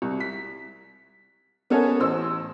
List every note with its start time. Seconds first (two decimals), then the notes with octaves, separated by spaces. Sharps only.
0.02 C2
0.20 B6
1.70 B3 C#4 A4 A#4 C#5
2.00 A1 C5 E6